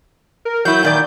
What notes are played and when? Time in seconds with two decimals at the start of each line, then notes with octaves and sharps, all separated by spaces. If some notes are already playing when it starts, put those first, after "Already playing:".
0.45 A#4
0.65 F#3 E4 G6
0.83 A#2 D#3 D5